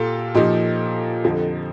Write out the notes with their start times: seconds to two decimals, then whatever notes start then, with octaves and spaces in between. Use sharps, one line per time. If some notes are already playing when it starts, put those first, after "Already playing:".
Already playing: A#2 F4 G4 A4
0.35 A#2 F3 D#4 G4
1.24 F2 D3 F3